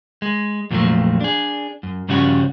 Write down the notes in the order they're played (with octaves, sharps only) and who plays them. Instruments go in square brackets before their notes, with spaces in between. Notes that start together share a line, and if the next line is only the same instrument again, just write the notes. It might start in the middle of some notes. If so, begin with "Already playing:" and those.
[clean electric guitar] G#3
F2 A#2 F3 F#3 A3
D4 G#4
F#2
G2 C#3 F3 G3 C#4 F#4